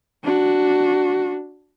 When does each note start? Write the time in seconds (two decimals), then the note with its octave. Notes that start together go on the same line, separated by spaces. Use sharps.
0.24 D4 F#4